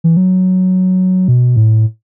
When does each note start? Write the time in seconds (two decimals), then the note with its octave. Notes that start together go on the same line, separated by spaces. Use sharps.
0.04 E3
0.17 F#3
1.28 B2
1.56 A2